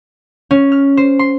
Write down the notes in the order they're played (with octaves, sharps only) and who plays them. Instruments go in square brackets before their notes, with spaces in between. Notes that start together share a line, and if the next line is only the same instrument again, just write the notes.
[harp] C#4
F6
C5
C6